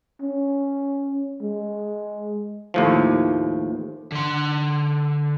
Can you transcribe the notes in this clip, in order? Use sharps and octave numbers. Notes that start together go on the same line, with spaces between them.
C#4
G#3
D#2 A2 F3
D3 C6